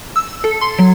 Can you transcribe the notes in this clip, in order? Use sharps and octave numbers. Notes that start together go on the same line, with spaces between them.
E6
A4
C6
F#3